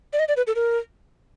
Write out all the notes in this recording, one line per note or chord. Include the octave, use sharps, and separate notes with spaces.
D5
D#5
D5
B4
A4
A#4